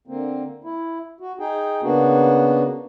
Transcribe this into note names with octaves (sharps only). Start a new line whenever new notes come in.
D3 A#3 C4
E4
F#4
D#4 G#4 G5
C#3 A#3 B3 D4 F#4